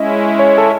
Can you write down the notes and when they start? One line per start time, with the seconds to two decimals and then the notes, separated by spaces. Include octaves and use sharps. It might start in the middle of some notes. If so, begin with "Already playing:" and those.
Already playing: G#3 C#4 E4 D#5
0.39 C#5
0.58 A4